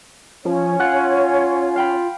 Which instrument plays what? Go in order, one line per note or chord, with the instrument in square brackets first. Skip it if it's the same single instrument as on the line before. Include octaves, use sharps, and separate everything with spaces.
[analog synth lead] F3 [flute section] C#4 C#5
[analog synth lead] F4 [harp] F#5 F#6
[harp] F5 G5 B5